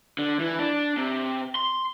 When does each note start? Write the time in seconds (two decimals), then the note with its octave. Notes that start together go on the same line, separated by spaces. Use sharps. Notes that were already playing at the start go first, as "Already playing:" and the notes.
0.19 D3
0.40 E3
0.59 D4
0.97 C3
1.56 C6